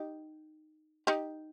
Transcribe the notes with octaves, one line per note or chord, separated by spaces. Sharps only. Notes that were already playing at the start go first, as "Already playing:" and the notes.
Already playing: D#4 G4
D#4 G4